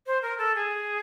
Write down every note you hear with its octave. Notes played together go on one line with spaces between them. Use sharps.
C5
A#4
A4
G#4